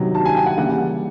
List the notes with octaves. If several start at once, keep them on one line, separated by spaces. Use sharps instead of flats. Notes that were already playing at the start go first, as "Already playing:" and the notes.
Already playing: C3 D#3 F#3 B3
A5
G#5
G5
F#5
C#3 E3 G3 A#3 F#5